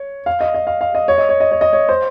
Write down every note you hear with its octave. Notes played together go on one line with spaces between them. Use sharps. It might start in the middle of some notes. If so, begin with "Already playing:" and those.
Already playing: C#5
F5
D#5
D#5
F5
F5
D#5
C#5
D#5
C#5
D#5
C#5
D#5
C#5
C5